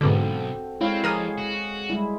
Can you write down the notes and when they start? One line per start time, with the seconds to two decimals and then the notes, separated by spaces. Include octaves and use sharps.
0.01 B1 G#2 B2 D3 C4 F#4 A4
0.81 G#3 C4 E4 C#5 F5
1.04 F2 G#4 A#4 D#6 F6
1.38 F#4
1.90 G3 G#3 E4